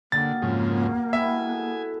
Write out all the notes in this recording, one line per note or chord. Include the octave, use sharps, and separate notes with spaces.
D3 F#3 G3 A#3 D#4 A6
F2 G#2 C#3
B2 G3 E4 E5 G#5
G#4 A4 F#5